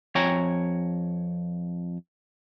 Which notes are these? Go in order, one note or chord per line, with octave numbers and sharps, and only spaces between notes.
F2 C#5 G5 G#5 A#5